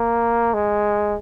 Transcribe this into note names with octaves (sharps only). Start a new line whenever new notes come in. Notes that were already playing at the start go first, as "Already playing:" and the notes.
Already playing: A#3
G#3